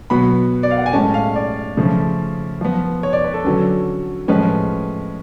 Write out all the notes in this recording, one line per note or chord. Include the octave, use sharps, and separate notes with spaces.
B2 F#3 B3 B5
D5
F5
F#5
G#5
A2 G#3 C#4 A5
F5
D5
C#3 F3 A3 C#4
F3 B3
C#5
D5
B4
A4
D3 F#3 C#4
A2 F3 G#3 C#4 B4